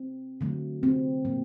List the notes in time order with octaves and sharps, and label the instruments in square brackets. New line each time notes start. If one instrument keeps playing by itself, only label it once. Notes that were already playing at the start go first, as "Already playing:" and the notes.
Already playing: [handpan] C4
D3 F#3 A3
C4
A#2 F#3 A#3